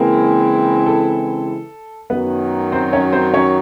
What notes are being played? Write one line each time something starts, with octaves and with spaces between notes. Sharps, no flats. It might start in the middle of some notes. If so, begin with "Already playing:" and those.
Already playing: C#3 E3 G#3 A#3 C4 E4 A#4
A4
F#2 D#3 F#3 B3 B4
C4 C5
C#4 C#5
C4 C5
C#4 C#5